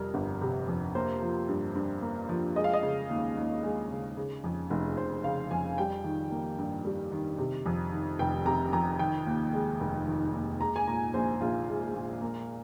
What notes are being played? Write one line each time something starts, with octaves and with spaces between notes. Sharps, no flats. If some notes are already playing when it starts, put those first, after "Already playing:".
Already playing: F2 C3 G3 A#4
G1
C3
F2
A#3 C5
F3
G2
G2
A#3
F3
G#3 D#5
F5
D#5
C#3
D#2
D#2
G#3
C#3
C#3
F2
F1
F1 C5
C#3 F5
F2 G#5
G3 G5
D#3
A#3
G2
G3
D#3
C3
F2
D#3
F1 G5
C3 A#5
F2 A#5
D#3 G5
D#2
G#3
F1
D#3
D#2
G#3 A#5
G#5
A#2 A#5
A#1 C5
A#1 F4
G#3
A#2
A#3